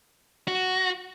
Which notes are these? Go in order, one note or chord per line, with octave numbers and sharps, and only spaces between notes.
F#4